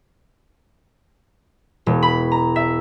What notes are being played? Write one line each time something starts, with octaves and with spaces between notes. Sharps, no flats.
E1
B5
A#5
E5